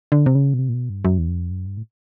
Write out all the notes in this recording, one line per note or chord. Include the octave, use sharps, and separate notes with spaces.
D3
C3
C#3
B2
C3
A#2
B2
G2
F#2
E2
F2
F#2
G2
A2